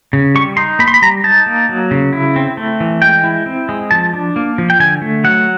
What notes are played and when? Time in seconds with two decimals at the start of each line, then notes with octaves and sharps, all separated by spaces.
0.13 C#3
0.35 G3 C#6
0.57 D#4 C6
0.79 A#3 B5
0.88 C6
0.94 B5
1.02 G3 A#5
1.24 D#4 A5
1.46 A#3
1.69 F#3
1.91 C#3
2.13 E4
2.36 C4
2.57 A3
2.80 E3
3.02 G#3 G5
3.24 E4
3.46 C4
3.69 G#3
3.91 F3 A5
4.14 D4
4.36 A#3
4.58 F3
4.70 G5
4.79 D3 G#5
5.02 A3
5.24 F#3 F#5